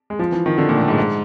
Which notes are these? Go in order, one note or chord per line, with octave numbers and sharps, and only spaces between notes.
G#3
F3
E3
D#3
D3
A#2
A2
G#2
G#2